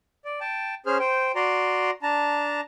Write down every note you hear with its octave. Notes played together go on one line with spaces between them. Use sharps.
D5
G5 A5
C#4 G#4 C5 F6
C5 G5
F#4 D5 A#5 C6
D4 A5 A#5